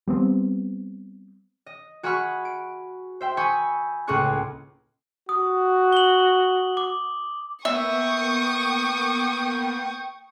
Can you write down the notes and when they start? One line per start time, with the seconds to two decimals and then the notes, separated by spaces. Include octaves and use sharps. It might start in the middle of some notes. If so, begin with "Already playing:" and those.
0.07 G3 B3 C4
1.66 D#5
2.03 F#4 G#4 F#5 B5 C#6 F6
2.45 D7
3.21 C5 E5 G5
3.37 G#5 B5 C#6 D#6 E6 G6
4.07 C#2 A2 A#3 G#4 C#6 F#6
5.29 F#4 D#6
5.93 F#7 G7
6.77 D6
7.65 A#3 B3 E5 G5 C#6 D#6